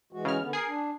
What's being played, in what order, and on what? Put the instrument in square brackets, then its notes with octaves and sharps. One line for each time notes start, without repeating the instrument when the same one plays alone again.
[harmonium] E3 G#3 F#4
[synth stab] C#3 F6
[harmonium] D3 B3
[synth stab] G#4 C7 [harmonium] A#4
[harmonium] D4